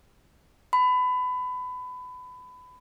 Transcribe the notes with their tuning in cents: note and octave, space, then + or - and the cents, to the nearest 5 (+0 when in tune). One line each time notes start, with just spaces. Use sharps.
B5 +25